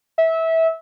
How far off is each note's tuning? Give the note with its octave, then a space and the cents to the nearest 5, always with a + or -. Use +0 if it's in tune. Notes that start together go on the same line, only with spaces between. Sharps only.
E5 -20